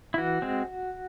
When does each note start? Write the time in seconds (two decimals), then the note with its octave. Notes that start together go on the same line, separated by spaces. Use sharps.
0.14 E4
0.18 E3 F#4
0.42 G#3 C4